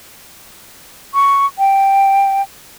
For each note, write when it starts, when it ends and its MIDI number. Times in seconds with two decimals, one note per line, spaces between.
1.14 1.46 85
1.59 2.42 79